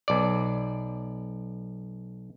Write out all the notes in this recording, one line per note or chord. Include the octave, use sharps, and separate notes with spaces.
B1 D5